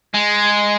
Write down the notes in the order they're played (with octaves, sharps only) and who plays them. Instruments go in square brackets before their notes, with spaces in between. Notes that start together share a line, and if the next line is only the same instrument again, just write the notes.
[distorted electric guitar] G#3